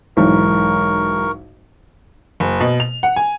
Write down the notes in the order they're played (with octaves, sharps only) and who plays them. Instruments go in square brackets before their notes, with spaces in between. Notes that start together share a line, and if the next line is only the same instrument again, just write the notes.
[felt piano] B1 G#2 E3 [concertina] A#4 C#6
[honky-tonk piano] F#1
B2
F7
F#5
G#5